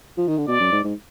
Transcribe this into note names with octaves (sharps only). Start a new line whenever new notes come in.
F3
D#3
D3
B2 D5
F#2
G#2
G#2